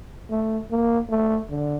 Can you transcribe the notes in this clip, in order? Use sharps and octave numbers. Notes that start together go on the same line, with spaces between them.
A3
A#3
A3
D3